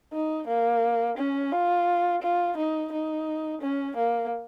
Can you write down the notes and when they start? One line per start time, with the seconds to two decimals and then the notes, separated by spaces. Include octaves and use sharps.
0.12 D#4
0.47 A#3
1.17 C#4
1.52 F4
2.22 F4
2.57 D#4
2.92 D#4
3.61 C#4
3.96 A#3